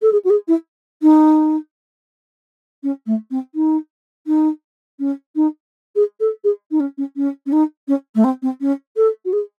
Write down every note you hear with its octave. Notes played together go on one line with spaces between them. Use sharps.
A4
G#4
F#4
G#4
E4
D#4
C#4
A3
C4
D#4
D#4
C#4
D#4
G#4
A4
G#4
D#4
C#4
C#4
C#4
C#4
D#4
C#4
A3
C4
C4
C#4
A4
F#4
G#4